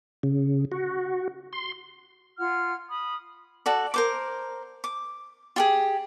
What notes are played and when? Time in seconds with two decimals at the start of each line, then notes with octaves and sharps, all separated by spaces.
0.23 C#3
0.72 F#4
1.53 C6
2.39 F4 F#5 F6 G#6
2.90 B5 D#6
3.66 F#4 A4 D5
3.94 A#4 C5 D6
4.84 D6
5.56 F4 G4 G#4